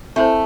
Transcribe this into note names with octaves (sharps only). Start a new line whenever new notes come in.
A3 C4 E4 A4 C5